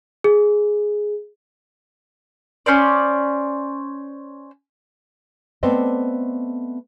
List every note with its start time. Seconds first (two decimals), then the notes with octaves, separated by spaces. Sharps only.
0.24 G#4
2.66 C#4 C5 D5
5.63 A3 B3 C4 C5 D5 D#5